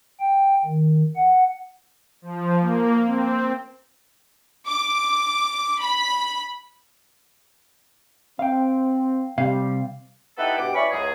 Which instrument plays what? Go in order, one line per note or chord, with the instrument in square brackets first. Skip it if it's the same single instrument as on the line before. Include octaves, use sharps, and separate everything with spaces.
[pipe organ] G5
D#3
F#5
[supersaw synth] F3
A#3
C4
[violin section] D6
B5
[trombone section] C4 [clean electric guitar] F5 G5
[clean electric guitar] C3 C4 F5 [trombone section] G3
[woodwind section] B3 D#4 E4 G4 A4 B4
G2 B2 G4 F#5 D6
C#4 E4 B4 D5 B5 C#6
C#2 F#2 G#4